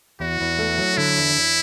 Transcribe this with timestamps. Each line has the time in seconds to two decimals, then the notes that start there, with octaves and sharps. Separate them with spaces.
0.20 E2 F#4
0.41 E2
0.59 A3
0.78 F#3
0.98 D3 E4
1.18 E2
1.36 E2